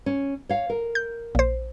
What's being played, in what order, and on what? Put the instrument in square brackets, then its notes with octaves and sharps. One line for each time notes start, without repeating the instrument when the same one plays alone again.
[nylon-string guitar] C#4
C#5 F5
A#4
[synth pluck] G6
A#1 C5